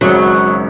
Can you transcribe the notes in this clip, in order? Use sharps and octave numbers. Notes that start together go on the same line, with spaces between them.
G#1 F#2 C#3 F#3